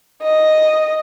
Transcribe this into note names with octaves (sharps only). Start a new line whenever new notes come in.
D#5